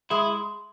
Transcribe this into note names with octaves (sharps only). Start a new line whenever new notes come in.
G#3 E4